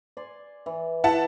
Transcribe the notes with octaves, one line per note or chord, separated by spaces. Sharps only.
D5 G#5 C6
E3
E4 F#5 A5